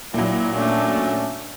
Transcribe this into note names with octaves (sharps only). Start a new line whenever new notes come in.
A#2 F#3 E4
A3 C#4 D4